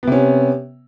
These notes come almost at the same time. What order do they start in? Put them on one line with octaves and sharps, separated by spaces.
B3 C3 C#4